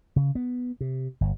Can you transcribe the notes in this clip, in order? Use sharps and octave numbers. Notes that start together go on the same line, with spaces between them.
C#3
B3
C3
G1